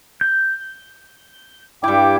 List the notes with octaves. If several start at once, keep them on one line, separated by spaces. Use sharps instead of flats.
G6
G2 G3 E4 G5 D6